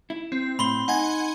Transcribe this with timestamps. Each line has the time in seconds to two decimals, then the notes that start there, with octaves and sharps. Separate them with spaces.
0.10 E4
0.32 C4
0.59 A2 B5 C6 G7
0.88 D#4 F#5 G#5 G#6